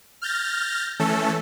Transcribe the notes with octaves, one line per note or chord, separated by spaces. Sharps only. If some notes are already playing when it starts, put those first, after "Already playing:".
F6 G6 A6 A#6
E3 A3 C#4 A4